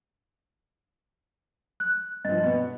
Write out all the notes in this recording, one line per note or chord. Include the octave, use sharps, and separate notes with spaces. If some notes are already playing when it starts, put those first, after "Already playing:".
F#6
G2 F3 D#5 A6
B2 B3